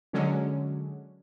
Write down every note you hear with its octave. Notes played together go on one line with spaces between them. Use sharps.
D3 F#3 G#3 C#4